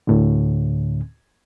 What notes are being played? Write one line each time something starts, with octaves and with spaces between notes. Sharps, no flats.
D2 A2 D3